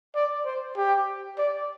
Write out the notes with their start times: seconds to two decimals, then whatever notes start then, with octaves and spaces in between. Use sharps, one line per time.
0.15 D5
0.45 C5
0.77 G4
1.38 D5